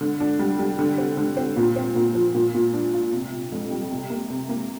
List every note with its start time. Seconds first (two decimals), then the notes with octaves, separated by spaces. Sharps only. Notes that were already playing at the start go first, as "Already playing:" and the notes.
0.01 D3
0.20 D4
0.39 G3
0.59 G3
0.79 D3
0.98 C4
1.17 D3
1.37 C4
1.57 A#2
1.76 C4
1.96 A#2
2.15 F3
2.34 A#2
2.54 A#2
2.73 D4
2.94 F4
3.13 C3
3.33 C3
3.52 F2
3.71 G3
3.91 C3
4.10 A#3
4.30 C3
4.49 A#3